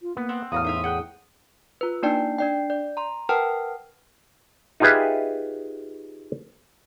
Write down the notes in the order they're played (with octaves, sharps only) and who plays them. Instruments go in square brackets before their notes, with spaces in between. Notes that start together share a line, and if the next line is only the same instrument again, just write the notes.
[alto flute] F4
[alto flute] A#3 [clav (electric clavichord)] B3
[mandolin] C4 F#5
[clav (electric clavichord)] E2 A2 [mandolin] F#4 A#5 F6 [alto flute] F5 [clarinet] D#6
[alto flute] D#4 [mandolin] C5 E5 F5
[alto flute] G#4 [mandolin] F#5 G5 F#6
[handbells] F4 B4
A#3 D4 D#4 D5 G5 A5
D4 D5 G5
D5
A#5 C6
A#4 B4 F#5 G5 A5 F6
[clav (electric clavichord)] D#4 F4 G4 G#4 B4 E5